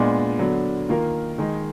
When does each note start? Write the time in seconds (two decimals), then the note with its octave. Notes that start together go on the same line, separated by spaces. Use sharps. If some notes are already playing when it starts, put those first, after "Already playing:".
Already playing: A#2 G#3 B3 D4
0.39 D3 F#3 B3 D4
0.89 D#3 A#3 F4 A#4
1.38 D#3 G#3 D#4